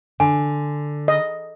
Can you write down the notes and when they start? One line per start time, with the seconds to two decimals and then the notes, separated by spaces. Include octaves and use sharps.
0.20 D3 G#5
1.08 D#5